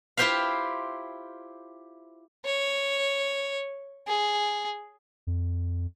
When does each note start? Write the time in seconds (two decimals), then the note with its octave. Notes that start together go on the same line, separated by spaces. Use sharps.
0.17 E4 F4 G4 C5 E5 F5
2.45 C#5
4.07 G#4
5.27 F2